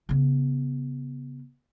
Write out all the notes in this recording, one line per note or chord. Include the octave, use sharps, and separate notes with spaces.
C#3 B3